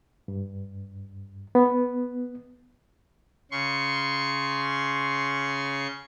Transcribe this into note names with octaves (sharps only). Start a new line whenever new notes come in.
G2
B3
C#3 C6 C#6